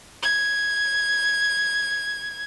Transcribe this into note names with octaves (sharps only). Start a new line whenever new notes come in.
G#6